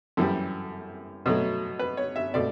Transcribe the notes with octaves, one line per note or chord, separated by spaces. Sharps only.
F#2 E3 G3 A4
B2 F#3 A3
B4
C#5
E5
B2 A3 D5